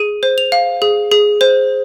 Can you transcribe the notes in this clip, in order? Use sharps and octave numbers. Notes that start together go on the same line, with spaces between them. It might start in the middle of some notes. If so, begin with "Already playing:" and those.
Already playing: G#4 D#7
C5
F7
F5
G#4
G#4
C5